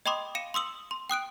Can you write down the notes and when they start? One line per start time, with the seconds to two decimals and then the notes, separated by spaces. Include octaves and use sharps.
0.06 D#5 G5 B5 C6 D6 D#6
0.35 F5 C#7 D#7 E7
0.54 C6 D#6 E6 F#7
0.91 C6
1.10 G5 D#6 F#6 D7